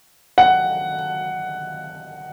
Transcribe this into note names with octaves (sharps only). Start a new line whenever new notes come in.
F#5